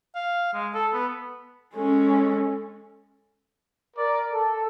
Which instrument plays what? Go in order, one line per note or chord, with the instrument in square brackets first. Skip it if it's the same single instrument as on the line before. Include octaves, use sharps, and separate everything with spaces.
[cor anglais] F5
G#3
A4
B3
[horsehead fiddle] G#3 C#4 [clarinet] A4
[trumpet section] A#4 D5
A4